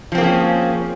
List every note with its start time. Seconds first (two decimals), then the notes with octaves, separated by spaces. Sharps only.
0.12 F3
0.15 C4
0.18 A#3
0.21 G#4
0.24 C#4